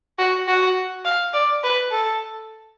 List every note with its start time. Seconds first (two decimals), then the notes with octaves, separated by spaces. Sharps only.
0.19 F#4
0.48 F#4
1.05 F5
1.34 D5
1.63 B4
1.91 A4